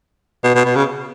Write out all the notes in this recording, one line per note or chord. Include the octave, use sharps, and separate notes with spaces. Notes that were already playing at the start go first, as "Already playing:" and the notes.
B2
B2
B2
C#3